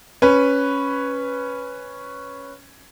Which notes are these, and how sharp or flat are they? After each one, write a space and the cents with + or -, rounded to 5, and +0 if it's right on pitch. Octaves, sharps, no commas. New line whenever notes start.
C#4 +0 B4 +0